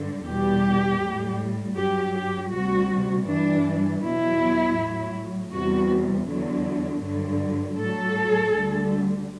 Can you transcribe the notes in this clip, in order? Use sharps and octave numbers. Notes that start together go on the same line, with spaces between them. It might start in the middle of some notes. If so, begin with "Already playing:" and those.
Already playing: G2 D3
E2 B2 G3 G4
A2 G3
G2 F#3 G4
G4
D2 C3 G3 F#4
G2 E3 G3 D4
E2 B2 F#3 E4
A2 F#3
E2 C3 G3 F#4
E2 D3 F#3
G2 D3 F#3
A2 F#3 A4
D2 D3 G3